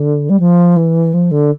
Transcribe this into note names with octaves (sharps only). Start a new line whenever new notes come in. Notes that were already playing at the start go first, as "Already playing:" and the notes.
Already playing: D3
G3
F3
E3
F3
D3